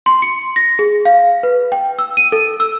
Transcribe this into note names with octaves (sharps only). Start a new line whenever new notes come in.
C6
C#7
A#6
G#4
F5
B4
G5
E6
D#7
A4
E6